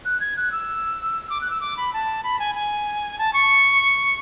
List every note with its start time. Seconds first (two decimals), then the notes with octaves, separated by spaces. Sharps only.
0.05 F#6
0.20 G#6
0.37 F#6
0.52 E6
1.30 D6
1.41 F#6
1.51 E6
1.61 D6
1.77 B5
1.93 A5
2.24 B5
2.39 G#5
2.55 G#5
3.19 A5
3.33 C#6